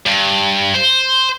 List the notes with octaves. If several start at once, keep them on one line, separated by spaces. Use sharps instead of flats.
G2
C5